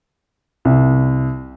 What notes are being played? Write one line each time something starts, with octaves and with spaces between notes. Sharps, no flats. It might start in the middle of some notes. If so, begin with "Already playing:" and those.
C2